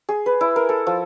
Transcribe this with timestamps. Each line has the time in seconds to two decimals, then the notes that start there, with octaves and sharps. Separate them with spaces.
0.09 G#4
0.26 B4
0.41 E4
0.56 A#4
0.69 A4
0.87 F3